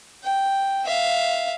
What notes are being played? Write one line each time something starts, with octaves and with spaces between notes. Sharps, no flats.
G5
E5 F5